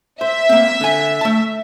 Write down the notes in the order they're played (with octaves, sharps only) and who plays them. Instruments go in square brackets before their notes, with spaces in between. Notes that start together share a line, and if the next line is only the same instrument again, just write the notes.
[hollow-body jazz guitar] C5 [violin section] E5
[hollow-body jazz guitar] A#3 C4
D3 G#5
A3 A5